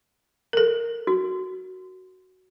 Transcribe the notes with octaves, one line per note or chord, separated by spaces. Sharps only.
A4 A#4
F#4